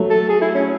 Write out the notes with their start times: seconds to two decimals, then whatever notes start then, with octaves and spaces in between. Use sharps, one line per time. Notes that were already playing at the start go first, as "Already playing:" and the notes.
Already playing: F#3 A3
0.10 A4
0.29 G#4
0.41 E4
0.55 C#4